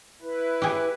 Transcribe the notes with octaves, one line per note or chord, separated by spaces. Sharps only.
E4 B4
G4 G#4